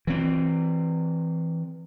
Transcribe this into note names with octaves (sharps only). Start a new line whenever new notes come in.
E3 C4